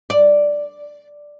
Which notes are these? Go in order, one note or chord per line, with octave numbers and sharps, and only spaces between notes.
D5